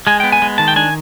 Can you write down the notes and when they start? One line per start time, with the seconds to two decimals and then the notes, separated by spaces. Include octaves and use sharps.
0.07 G#3 G#5
0.20 B3 G5
0.32 G#5
0.42 G#3
0.58 D#3 A5
0.68 G5
0.76 D4 G#5